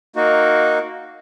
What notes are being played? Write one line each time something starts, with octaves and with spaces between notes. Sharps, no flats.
A#3 D#4 F#4